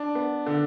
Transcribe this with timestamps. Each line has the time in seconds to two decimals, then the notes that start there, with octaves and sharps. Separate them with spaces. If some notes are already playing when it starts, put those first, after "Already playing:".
Already playing: D4
0.15 B3
0.46 D3